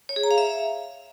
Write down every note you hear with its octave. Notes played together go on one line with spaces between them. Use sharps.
C#5
G#4
A#5
F5
E5